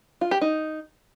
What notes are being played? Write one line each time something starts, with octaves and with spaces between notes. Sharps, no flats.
F4
G4
D#4